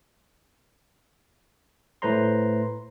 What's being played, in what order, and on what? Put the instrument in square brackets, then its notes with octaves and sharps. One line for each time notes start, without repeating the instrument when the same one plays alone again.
[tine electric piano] A2 A3 B4 C5 A#5 C6